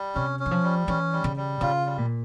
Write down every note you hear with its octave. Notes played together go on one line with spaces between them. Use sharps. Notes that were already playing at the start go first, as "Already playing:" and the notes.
Already playing: G3
C3 C#4
C#4
E3
F3
G3
E3 C#4
G3
C#3
G3
C#3 F4
G3
A#2